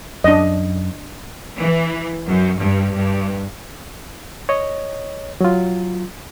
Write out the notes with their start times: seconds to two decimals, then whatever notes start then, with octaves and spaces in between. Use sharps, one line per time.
0.24 F#2 D4 D#5
1.59 E3
2.28 F#2
2.59 G2
2.95 G2
4.49 C#5 D#5
5.41 F#3 F4